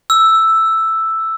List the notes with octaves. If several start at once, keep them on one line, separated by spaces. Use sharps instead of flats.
E6